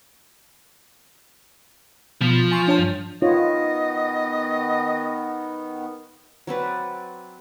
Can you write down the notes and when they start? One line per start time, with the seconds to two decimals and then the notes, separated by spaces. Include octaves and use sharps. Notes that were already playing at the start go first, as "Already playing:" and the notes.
2.21 B2 F3 A6 B6
2.51 G#5 C6 C#6
2.68 D4 C#5 A5
2.79 G2
3.22 D#3 B3 D#4 F4 C#5 D#5
6.47 F#3 C4 B4 D5